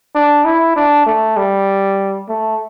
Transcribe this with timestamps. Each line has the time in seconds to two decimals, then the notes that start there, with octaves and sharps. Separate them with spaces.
0.15 D4
0.45 E4
0.76 D4
1.07 A3
1.37 G3
2.29 A3